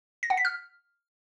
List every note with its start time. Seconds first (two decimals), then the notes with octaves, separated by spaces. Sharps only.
0.23 A#6
0.30 F#5
0.37 B6
0.45 F6